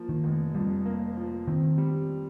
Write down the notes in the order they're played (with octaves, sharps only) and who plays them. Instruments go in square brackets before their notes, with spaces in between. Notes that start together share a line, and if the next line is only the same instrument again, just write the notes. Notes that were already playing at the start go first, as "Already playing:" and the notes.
Already playing: [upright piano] F3 A#3
[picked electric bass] D#3
[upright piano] F1
[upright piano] F2 [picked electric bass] G3
[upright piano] A#3
F3
[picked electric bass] D#3 [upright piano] C4
[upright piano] G3